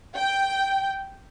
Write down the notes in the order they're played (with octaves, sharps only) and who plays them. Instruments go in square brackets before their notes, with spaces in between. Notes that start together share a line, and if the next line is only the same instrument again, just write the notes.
[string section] G5